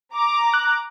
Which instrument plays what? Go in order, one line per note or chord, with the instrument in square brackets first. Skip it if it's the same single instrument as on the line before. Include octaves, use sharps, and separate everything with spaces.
[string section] A#5 D6
[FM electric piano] F#6